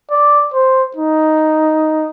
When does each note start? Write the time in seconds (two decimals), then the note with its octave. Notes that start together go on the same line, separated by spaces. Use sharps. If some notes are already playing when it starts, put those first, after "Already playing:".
0.11 D5
0.54 C5
0.96 D#4